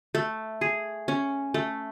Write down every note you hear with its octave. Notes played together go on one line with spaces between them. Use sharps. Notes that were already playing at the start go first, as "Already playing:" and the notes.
A3
G#4
C#4
A3